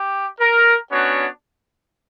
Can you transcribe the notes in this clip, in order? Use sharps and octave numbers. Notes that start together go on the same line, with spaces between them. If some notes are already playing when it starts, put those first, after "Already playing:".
Already playing: G4
A#4
B3 C#4 D4 F#4 C#5